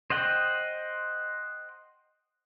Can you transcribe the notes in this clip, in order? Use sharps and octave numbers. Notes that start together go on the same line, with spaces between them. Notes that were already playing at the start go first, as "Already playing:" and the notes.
C5 D#5 F#5 G5